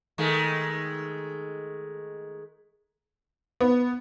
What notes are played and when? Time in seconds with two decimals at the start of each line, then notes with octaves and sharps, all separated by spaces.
0.18 D#3 G#3 A3
3.61 B3